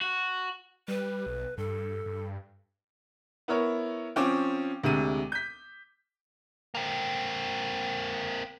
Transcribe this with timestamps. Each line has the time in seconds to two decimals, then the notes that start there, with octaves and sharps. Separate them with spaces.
0.01 F#4
0.88 G3 B4
1.27 B1
1.58 G2 A4
2.06 G2
3.48 B3 E4 A#4 C#5
4.16 F3 C4 C#4 D6
4.83 D2 C3 G#3 D#7
5.32 G6 B6
6.75 A#3 C4